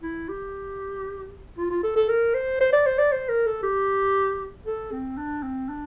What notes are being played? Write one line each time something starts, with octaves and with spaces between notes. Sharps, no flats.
E4
G4
F4
F4
A4
A4
A#4
C5
C5
D5
C5
D5
C5
A#4
A4
G4
A4
C4
D4
C4
D4